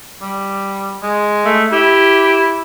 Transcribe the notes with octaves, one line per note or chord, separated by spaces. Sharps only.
G3
G#3
A3
E4 G4